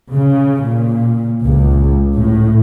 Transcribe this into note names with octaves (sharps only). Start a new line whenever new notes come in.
C#3
A#2
C#2
A2